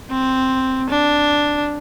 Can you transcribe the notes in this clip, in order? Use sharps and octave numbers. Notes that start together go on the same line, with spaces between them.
C4
D4